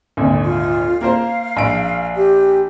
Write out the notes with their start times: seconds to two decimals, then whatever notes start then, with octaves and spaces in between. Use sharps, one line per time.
0.17 G#1 D2 A#2
0.44 F4
1.01 A#3 A#4 C5 F5
1.57 A#1 D7
2.15 G4